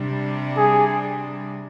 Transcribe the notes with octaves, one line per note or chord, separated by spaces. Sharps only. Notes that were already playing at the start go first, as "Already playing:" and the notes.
Already playing: C3 G3 D4
G#4